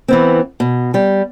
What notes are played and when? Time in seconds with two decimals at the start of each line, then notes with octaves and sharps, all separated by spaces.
0.08 E3 B3 C4
0.60 B2
0.94 G3